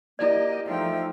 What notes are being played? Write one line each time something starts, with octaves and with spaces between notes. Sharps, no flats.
A#3 E4 G4 D5 D#5
F3 A3 D#4 E5 G5